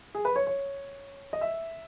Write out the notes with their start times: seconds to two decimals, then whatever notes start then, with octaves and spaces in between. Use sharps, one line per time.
0.15 G#4
0.25 B4
0.36 C#5
0.47 C#5
1.33 D#5
1.41 E5